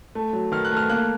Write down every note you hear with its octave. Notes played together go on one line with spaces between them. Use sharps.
A3
F#3
D#3 F6
F#6
A3 F6
A#3 F#6